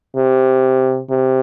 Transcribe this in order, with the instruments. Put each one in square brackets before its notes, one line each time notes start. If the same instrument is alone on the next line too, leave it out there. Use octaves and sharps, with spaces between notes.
[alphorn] C3
C3